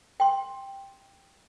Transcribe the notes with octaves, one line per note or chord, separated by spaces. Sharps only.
G5 C6